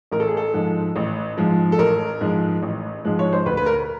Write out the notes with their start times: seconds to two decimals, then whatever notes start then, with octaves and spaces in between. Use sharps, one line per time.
0.12 A1 A#4
0.20 A4
0.28 G#4
0.37 A4
0.54 G#2 F3 G#3
0.96 A1
1.37 G#2 F3 G#3
1.72 A4
1.78 A1 A#4
2.21 G#2 F3 G#3
2.62 A1
3.05 G#2 F3 G#3
3.19 C#5
3.33 C5
3.46 D2 B4
3.57 B4
3.66 A#4